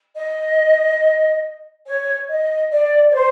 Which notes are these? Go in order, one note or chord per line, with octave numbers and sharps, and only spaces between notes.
D#5
C#5
D#5
D5
C#5
C5